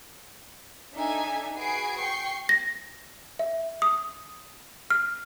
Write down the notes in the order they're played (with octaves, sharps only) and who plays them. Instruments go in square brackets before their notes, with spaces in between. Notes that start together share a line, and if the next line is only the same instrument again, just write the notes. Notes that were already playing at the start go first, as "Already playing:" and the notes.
[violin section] D4 D#4 A4 E5 G#5
F#4 G#4 B4 G#5 C7 D7
G5 C#6 C7
[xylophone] A#6
E5
D#6
F6